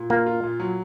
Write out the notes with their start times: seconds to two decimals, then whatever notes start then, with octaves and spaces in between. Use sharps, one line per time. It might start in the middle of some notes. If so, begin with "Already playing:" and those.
Already playing: A#2
0.10 A#3 F4
0.26 F4
0.43 A#2
0.60 F#3